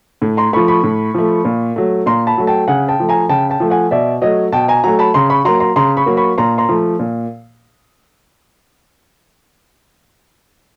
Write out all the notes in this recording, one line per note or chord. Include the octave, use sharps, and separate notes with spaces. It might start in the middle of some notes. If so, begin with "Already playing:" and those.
A2
A#5 C6
F3 A3 B5 C#6
B5 C#6
A2
F3 A3
A#2
F#3 A3
A#2 A#5 C6
A5 B5
F#3 A3
G5 A5
C#3 F#5 G#5
G5 A5
F3 A3
G#5 A#5
C#3 G5 A5
G5 A5
F3 A3
F#5 G#5
B2 D5 E5
F#3 A3 C#5 D#5
B2 G5 A5
G#5 A#5
F#3 A3 G#5 A#5
A5 B5
C#3 A#5 C6
B5 C#6
F#3 A#3 A#5 C6
A#5 C6
C#3 A#5 C6
B5 C#6
F#3 A#3
B5 C#6
A#2 A#5 C6
A#5 C6
F3 A3
A#2